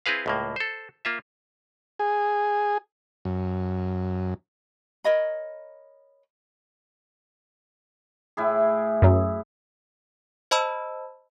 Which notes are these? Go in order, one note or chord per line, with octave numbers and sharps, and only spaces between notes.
C4 E4 G#4 B4 F5
C#2 A2 A#3
A4 C5
A#3 F4 E5
G#4
F#2
A#4 C#5 D#5 B5
A2 E4 G#4
F#2 F#3
C5 D#5 A5 B5 E6